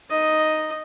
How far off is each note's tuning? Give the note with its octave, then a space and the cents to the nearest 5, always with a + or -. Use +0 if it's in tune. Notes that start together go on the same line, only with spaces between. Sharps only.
D#4 +0 D#5 +0